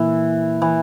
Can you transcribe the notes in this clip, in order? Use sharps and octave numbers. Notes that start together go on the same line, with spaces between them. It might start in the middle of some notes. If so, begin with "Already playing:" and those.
Already playing: A#2 E3 A#3 E4
E3